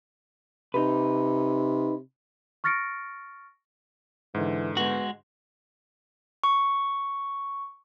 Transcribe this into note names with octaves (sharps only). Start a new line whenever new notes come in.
C3 D#4 B4
C#6 F6 A6 A#6 C#7 D7
G#2 D3 E3
G#3 B3 F#4
C#6